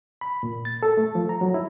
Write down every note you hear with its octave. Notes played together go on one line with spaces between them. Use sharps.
B5
A#2
A6
A4
A3
F3
A#5
F#3
E4